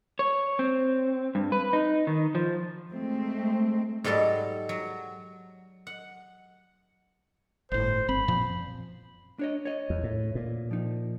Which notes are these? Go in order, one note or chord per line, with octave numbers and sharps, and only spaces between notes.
C#5
C4
G2
B4
D#4
D#3
F3
G#3 A3 C4
G#2 F#3 G3 A4 A5
F#3
F#5
G1 A2 C5
G1 C4 B5
F#2 A#2 F3
D4 C#5 D#5
C#5 D#5
E2
A2
A#2
F3 D#4